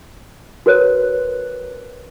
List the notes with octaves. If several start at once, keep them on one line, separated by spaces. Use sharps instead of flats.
F#4 A#4 B4 C#5 F#6